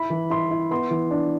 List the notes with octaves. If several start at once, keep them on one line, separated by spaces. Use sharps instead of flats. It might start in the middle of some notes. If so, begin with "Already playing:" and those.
Already playing: E4 B5
E3
E4 C6
E4
B3 C6
E3
D4